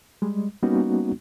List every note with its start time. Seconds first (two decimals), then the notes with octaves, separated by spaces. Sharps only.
0.22 G3 G#3
0.62 G3 A#3 B3 C#4 D#4 F#4